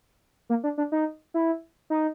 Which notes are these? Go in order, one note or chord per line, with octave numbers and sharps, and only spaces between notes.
A#3
D4
D4
D#4
E4
D#4